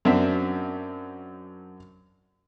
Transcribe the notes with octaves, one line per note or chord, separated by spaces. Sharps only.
F#2 C4 D4 E5